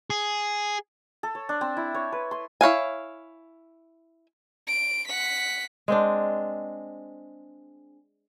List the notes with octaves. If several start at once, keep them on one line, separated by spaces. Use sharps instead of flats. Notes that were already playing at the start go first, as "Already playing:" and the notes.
G#4
A4
C#5
D4
C4
E4
C#5
B4
C6
E4 C#5 F5 G#5
D7
F#5 B6
G#3 C4 D4